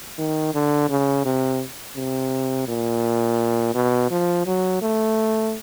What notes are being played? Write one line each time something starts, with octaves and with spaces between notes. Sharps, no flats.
D#3
D3
C#3
C3
C3
A#2
B2
F3
F#3
A3